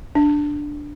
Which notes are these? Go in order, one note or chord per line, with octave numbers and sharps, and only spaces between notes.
D4